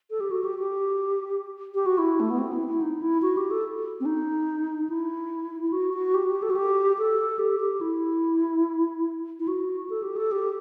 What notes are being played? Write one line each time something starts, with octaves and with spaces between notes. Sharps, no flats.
A4
G4
F#4
G4
G4
G4
F#4
E4
A3
B3
C4
E4
E4
D#4
E4
F#4
G4
A4
C4
D#4
E4
E4
F#4
F#4
G4
G4
A4
F#4
G4
A4
G4
G4
E4
E4
F#4
A4
G4
A4
G4